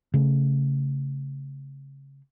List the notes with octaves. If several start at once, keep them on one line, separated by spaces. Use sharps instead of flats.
C#3 A3